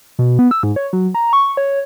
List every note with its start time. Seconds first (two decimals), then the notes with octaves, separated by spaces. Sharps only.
0.19 B2
0.39 B3
0.51 E6
0.63 G#2
0.76 C#5
0.93 F#3
1.15 A#5
1.33 C#6
1.57 C#5